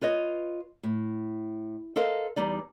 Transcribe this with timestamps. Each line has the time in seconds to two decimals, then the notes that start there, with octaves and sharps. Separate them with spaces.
0.01 F4 B4 C#5 D#5
0.83 A2
1.96 A4 A#4 C5 D#5 F5
2.36 E2 G3 D#4 D5